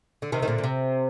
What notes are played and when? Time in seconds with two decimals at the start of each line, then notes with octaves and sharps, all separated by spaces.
0.22 D3
0.32 C3 D#3
0.42 D#3
0.48 A#2 D3
0.58 A#2
0.64 C3